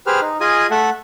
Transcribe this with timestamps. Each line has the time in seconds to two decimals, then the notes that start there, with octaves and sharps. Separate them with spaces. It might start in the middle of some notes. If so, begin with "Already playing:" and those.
0.07 G4 G#4 B4 C5 F6
0.22 D#4
0.40 F4 G#4 D#5 G#5 D#6
0.71 A3 A4 E5 F#5